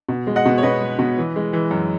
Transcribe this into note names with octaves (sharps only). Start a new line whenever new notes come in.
B2
G#3
D#5 F#5
B2
C#5
B2 B4 D#5
G#3
B2
E3
G#3
E3
F#2